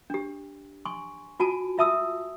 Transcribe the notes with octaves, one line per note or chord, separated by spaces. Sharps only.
D4 G4
G#5 C6 C#6
F4 F#4 G#5 A5
F4 E5 A5 D#6 E6